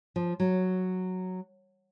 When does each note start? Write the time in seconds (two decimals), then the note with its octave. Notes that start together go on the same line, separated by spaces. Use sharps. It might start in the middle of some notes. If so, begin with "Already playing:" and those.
0.16 F3
0.40 F#3